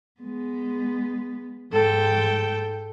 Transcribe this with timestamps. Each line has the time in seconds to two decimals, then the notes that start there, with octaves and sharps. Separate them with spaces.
0.21 G#3 B3
1.72 G#2 A4 G5